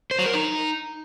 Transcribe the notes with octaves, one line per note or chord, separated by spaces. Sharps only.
C5
F#3
A#4
D#4